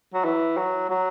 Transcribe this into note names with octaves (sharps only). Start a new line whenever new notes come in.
F#3
E3
F#3
F#3